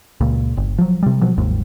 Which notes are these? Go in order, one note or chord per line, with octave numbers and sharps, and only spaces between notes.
C#2 A#2
G1
F3 F#3
C3 G3
B2 F3 F#3
G1 D#2 G#2